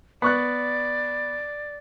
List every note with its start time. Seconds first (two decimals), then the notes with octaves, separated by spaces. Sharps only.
0.22 B3 D5 C#6 F#6